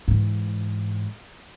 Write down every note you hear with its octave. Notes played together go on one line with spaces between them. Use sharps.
G#2 E3